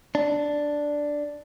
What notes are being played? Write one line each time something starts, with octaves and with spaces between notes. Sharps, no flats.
D4